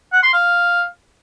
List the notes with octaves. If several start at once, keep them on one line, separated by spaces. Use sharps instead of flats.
F#5
C6
F5